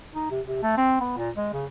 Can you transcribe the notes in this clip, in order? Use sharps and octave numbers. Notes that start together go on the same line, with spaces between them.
D#4
C3
C3
A3
C4
B3
A#2
G#3
C#3